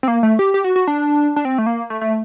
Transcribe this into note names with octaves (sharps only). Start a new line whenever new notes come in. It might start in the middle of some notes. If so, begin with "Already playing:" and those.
C4
A#3
A3
G4
G4
F#4
F#4
D4
D4
C4
A3
A#3
A3
A3